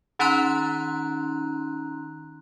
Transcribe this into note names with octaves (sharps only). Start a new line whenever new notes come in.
D#3 C#4 D#4 A#5 C6 F#6